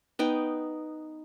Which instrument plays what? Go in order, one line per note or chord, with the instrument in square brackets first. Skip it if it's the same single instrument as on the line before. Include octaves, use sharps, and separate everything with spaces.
[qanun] B3 D#4 G5